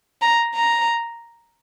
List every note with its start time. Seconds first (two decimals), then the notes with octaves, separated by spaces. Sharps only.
0.22 A#5
0.55 A#5